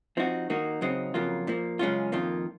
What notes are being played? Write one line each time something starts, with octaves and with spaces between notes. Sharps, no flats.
F3 C4 D#4 F#4
D#3 A#3 D#4 F#4
C#3 F#3 C4 D#4
F2 C#3 F#3 A#3 F4
A#2 F3 A#3
F#2 C#3 G#3 C#4 F4
F2 D#3 A#3 F4